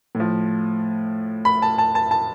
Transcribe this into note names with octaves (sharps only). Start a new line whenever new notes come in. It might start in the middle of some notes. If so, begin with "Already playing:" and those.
A2
F3
B5
A5
A5
A5
A5